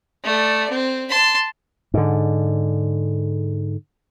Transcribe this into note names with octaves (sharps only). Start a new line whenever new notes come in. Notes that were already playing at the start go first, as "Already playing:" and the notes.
A3 D5
C4
A5 C6
G#2 D3